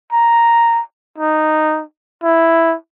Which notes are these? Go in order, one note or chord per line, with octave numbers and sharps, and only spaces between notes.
A#5
D#4
E4